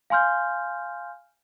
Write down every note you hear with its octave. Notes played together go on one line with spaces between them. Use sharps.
F5 G#5 C6 F6 G6